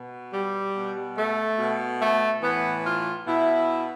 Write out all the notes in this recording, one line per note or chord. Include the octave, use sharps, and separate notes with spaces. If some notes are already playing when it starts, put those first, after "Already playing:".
Already playing: B2
G3
B2
A3
B2
A3
A2 E3 B3
F4
B2 E4